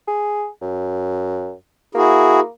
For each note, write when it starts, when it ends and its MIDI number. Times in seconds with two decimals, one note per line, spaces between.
0.08 0.47 68
0.62 1.52 42
1.95 2.48 58
1.95 2.40 64
1.95 2.40 66
1.95 2.40 68